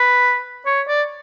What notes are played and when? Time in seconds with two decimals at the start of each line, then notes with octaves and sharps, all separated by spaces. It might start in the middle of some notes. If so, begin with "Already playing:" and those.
Already playing: B4
0.66 C#5
0.88 D5